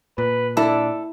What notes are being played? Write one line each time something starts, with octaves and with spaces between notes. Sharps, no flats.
A#2 B4
D4 E4 A4